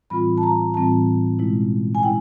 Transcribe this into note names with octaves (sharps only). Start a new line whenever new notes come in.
A2 E3 G3 C4 F4 B5
A5
A#5
A2 E3 G3 C4 F4 A5
B2 G#3 C#4 E4
G#5
B2 G#3 C#4 E4 G5